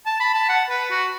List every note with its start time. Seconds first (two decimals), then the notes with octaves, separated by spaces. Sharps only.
0.06 A5
0.20 B5
0.34 A5
0.49 F#5
0.70 B4
0.91 F#4